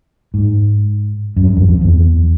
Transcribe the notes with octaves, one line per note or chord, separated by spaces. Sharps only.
G#2
F#2
G2
F2
F2
E2